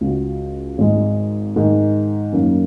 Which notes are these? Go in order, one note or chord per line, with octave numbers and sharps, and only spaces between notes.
C#2 C#3 G#3 F#4
G#1 G#2 G#3 D#4
G#2 D#3 G#3 D#4
F#2 D#3 A#3 C#4